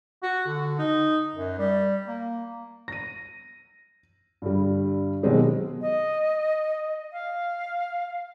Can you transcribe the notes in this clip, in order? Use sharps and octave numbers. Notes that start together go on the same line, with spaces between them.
F#4
D3
D#4
F#2
G3
A#3
A#6 D#7
G2 D3 G3
B2 D#3 F#3 G#3 C4 G4
D#5
F5